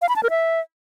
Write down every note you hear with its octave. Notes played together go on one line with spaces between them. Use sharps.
F5
B5
A5
A#4
E5